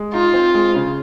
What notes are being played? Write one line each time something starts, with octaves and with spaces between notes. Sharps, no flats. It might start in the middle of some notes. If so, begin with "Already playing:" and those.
Already playing: G#3
D#4 F4
C4
G#3
C#3